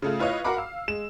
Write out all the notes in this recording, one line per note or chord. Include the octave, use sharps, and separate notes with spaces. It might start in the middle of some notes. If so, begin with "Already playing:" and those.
C#3 A3 F4
E4 F4 B4 C#5 D#5 F5
F#4 A#4 F5 F#5 B5 D6
F5 E6
G#3 E7